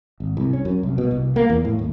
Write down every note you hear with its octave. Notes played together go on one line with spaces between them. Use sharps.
G#1
C2
C#4
F#2
C2
B2
C2
A#3
E2
A2
D#1